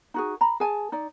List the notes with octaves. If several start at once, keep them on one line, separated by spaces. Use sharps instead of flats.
D#4 F#4 G#4
A#5 B5
G#4 G#5 A5
D#4 D5